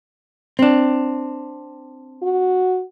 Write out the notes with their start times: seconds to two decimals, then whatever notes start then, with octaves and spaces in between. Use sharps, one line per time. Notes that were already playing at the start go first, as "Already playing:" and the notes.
0.59 C4 D4
2.23 F#4